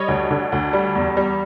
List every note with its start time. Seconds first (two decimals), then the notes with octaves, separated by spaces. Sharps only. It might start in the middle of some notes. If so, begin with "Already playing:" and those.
Already playing: G3 C#5 D#5
0.08 D2
0.31 D3
0.52 D2
0.73 G3
0.95 E2
1.17 G3